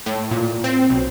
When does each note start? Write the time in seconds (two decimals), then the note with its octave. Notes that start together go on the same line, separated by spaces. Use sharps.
0.06 A2
0.31 A#2
0.64 C4
0.90 B1